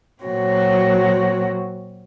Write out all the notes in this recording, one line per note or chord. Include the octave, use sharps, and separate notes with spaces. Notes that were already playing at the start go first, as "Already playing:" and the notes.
A#2 F#3 C4 F#4 C#5